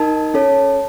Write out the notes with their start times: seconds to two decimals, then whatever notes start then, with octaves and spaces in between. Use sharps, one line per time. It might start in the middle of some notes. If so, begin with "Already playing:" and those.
Already playing: D#4 A#4 D#5 A5
0.34 C#4 A4 C#5 A5